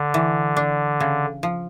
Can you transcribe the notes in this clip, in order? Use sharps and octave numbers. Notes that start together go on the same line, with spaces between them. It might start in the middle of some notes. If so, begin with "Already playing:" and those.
Already playing: D3
E3
D4
C#3
F3